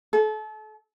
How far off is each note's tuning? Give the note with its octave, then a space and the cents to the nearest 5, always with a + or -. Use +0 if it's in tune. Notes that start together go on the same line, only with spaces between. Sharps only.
A4 -35